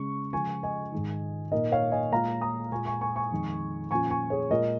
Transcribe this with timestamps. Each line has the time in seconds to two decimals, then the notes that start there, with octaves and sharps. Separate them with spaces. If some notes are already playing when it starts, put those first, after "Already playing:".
Already playing: C#3 G#3 C#4 C#6
0.33 C#3 F3 G#3 F4 G#5 C#6
0.63 D#5 G#5
0.92 G#2 D#3 G#3 D#4
1.52 A#2 A#3 D#4 A#4 D#5
1.72 C#5 F5
1.92 D#5 G#5
2.12 A#2 G#3 F4 F5 A#5
2.41 A#5 D#6
2.72 A#2 G#3 F4 G#5 C#6
2.86 G#5 C#6
3.01 G#5 C#6
3.16 G#5 C#6
3.31 F2 D#3 G#3 D#4
3.91 A#2 F3 C#4 F4 G#5 C#6
4.10 G#5 C#6
4.30 G#4 C#5
4.50 A#2 G#3 F4 A#4 D#5